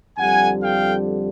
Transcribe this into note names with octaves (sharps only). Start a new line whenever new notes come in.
F2 D3 G3 F#5 G#5
F5 G5